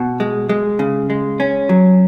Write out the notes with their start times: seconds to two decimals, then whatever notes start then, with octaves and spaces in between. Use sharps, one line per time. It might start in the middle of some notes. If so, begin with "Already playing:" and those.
Already playing: B2 F#4
0.20 G#3
0.49 G#3
0.79 C#3
1.10 G#3
1.40 C#4
1.69 F#3